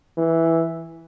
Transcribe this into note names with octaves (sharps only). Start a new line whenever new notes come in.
E3